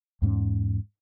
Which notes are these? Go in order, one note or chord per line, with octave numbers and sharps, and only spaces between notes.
E2 G#2 A3 C#4